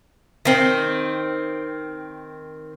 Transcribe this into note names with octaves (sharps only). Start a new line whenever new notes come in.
D#3 C4